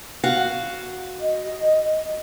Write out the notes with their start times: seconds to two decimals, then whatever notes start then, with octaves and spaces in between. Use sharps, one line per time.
0.24 F#4 F5
1.21 D#5